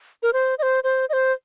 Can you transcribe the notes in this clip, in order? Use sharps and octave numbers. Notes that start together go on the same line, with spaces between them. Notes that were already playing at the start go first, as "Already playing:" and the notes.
A#4
C5
D#5
C5
C5
D#5
C5